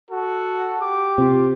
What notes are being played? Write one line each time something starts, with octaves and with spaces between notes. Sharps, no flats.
F#4 A4
G4 D6
C3 F4